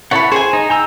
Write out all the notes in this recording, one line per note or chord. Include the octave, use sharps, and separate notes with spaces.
E4 A4 C#5 F#5 B5
G#4 C5 G#5
D#4
G5 A#5 E6